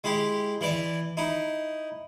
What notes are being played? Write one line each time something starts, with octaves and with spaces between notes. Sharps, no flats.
G#3 E4 G4
E3 E4 D5
D#4 E4